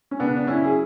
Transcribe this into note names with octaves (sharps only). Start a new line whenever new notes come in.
C#4
C#3 B3 D4
D4
C#4 E4
F#3 G#4